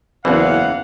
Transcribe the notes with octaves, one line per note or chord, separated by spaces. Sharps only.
F#1 E2 E3 C5 F5 F#5